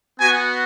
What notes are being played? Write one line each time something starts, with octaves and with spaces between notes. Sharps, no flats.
B3 F#4 G#5